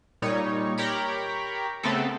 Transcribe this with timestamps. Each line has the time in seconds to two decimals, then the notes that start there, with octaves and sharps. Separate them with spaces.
0.22 A#2 G3 D#4 C#5
0.78 G4 A#4 C#5 A#5 B5
1.83 C#3 A3 B3 C4 A4